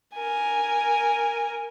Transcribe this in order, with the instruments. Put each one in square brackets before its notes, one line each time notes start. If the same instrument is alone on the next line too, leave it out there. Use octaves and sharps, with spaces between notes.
[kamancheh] A#4 G#5